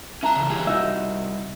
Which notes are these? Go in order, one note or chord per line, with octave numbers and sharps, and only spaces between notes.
C#4 E5 A5 A#5
C#3 E3
E3 G4 G#4
C2 D#4 F#4 E5